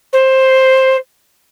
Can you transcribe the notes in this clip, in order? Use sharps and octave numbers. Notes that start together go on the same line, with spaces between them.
C5